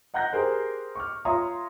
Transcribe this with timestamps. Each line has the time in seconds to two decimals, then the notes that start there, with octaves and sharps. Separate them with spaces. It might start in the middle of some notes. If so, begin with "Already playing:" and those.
0.14 D#5 F#5 A#5 F#6 G6 A#6
0.33 G4 G#4 A#4 C5
0.95 C#6 D6 F6
1.25 F4 C#5 E5 A#5 C6 D#6